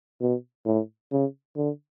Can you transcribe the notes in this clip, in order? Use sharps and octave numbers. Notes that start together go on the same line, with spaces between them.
B2
A2
C#3
D3